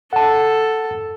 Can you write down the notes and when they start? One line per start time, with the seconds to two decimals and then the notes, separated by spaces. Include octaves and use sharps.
0.13 A4 F#5 A5